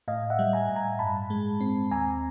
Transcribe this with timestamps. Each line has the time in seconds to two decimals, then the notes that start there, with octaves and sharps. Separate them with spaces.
0.08 A2 D#5 F5
0.30 E5 F#5
0.39 G3
0.53 G#5 A#5
0.69 A2
0.76 G#5 A#5
0.99 G2 A5 B5
1.30 G#3
1.61 C4
1.91 D#2 G#5 A#5